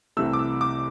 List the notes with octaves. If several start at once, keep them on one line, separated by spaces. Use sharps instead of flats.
C2 C3 E3 A3 E6
D6
E6
D6